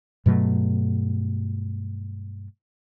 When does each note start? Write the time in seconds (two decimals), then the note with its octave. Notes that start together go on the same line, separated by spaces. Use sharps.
0.26 G2 B2 F#3 A3